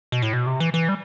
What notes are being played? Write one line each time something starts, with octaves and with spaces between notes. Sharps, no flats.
B2
A2
B2
C3
E3
E3
G3